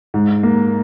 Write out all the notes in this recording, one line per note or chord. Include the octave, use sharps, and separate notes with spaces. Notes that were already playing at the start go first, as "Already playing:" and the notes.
G#2
A#3